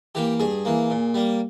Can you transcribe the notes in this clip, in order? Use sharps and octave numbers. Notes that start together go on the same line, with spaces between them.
E3 A#3 G4
G2 G#4
E3 A#3
A#2
G3 A#3